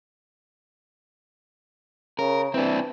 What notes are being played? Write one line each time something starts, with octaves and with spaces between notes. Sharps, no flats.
C#3 A#4
E3 C4 D4